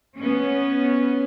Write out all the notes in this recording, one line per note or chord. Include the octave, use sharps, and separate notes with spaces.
B3 C#4